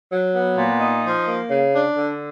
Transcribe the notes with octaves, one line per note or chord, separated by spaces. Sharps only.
F#3
B3
A#2
D#4
F3
A#3
C#3
D4
D3